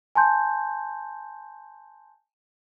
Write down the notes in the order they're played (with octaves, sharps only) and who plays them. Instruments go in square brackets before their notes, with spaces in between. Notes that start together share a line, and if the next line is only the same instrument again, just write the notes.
[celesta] G#5 A5 C6 G6